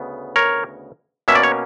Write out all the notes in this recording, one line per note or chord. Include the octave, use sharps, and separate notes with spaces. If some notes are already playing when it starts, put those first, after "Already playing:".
Already playing: D2 C#3 B3
A#4 C#5
B2 A#3 C#4 E5
D5
C#5